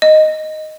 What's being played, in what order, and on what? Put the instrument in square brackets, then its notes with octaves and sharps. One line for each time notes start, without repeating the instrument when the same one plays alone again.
[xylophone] D#5